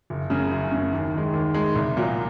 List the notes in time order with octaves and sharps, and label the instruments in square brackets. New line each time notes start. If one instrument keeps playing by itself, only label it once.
[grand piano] F#1
F#2 C#3
F#1
F#2 C#3
D#2
D#3 G#3
D#2
D#3 G#3
C2
A#2 F#3